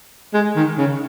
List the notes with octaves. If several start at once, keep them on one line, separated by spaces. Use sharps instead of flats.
G#3
D#3
C#3